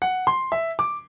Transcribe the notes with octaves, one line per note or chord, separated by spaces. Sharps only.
F#5
C6
E5
D6